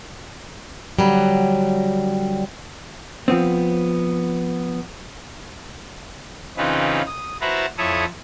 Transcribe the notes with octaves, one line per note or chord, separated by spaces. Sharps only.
D3 F#3 G3
F3 B3 C4
C#3 E3 C4 D#4 F4 B4
D#6
E4 F#4 B4 C5 A5 A#5
F2 E4 A4 C#5 E5 D#6